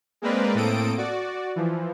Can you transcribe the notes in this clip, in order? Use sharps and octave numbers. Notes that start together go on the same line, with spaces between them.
G#3 A#3 C4 A#4 B4 D5
A2 A#3 C4 A4 D#6 D7
F#4 D5
E3 F3